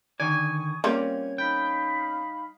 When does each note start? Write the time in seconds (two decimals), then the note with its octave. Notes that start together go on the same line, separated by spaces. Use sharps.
0.20 D3 D#3 D5 G#5 C#6 D#6
0.84 G3 A#3 C4 C#4 F4 G#6
1.38 D#4 F5 G5 B5